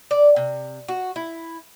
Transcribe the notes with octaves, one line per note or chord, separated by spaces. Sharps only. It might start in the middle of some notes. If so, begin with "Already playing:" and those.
D5
C3
F#4
E4